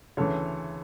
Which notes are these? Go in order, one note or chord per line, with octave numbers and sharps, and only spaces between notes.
D2 C#3 E3 A4 C#5